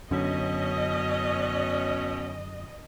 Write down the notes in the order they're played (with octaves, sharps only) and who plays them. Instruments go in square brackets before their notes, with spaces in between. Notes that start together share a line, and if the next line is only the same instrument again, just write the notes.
[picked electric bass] F#2 D3 [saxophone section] B2 C#4 [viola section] D#5